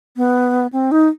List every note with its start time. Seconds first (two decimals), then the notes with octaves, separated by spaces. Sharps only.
0.17 B3
0.73 C4
0.92 D#4